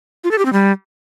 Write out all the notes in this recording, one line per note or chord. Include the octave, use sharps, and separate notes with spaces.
F4
A4
G4
C4
G3